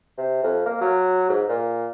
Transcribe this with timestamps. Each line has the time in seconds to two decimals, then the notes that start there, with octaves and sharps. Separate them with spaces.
0.18 C3
0.43 F2
0.66 A#3
0.81 F#3
1.29 G#2
1.49 A#2